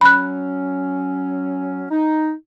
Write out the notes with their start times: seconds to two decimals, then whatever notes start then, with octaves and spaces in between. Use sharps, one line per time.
0.01 F#3 C#4 B5 F#6
1.91 D#4